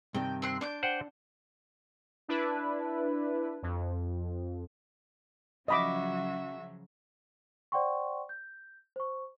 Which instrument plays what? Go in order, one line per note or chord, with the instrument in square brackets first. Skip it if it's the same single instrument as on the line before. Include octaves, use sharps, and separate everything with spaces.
[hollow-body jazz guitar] G2 C3 D#3 [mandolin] G5
[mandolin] C4 C6 F#6
[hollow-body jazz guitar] D4 [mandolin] C6 D6 G6
[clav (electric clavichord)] C5 F#5 G5
[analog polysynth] D4 E4 B4
F2
[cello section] C#3 F3 F#3 [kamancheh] F#4 E5 [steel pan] D#5 B5 D6
[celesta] C5 D5 F#5 G5 C6 C#6
G6
C5 C#6